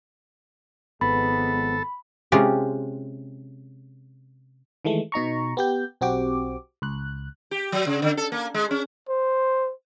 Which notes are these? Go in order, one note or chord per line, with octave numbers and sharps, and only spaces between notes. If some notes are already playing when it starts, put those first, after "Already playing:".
G#1 F3 G#3 B3 A4 B5
C3 G#3 C#4 F4 G4
D#3 E3 G#3 A3
B2 D#4 A#5 C#6
B3 G4 G6
B1 C4 F#4 G4 D6
C#2 F#6
G4
F#3
C#3
D3
A4
A#3
G#3
C#4
C5